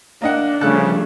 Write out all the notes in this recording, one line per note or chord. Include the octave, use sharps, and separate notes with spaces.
A#3 D4 D#5 F#5
C2 C#3 F3 G3 A3 A4 A5 F#6